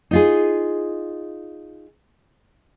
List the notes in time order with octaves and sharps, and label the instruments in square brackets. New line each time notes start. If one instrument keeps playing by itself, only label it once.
[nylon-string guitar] D#4 F4 G#4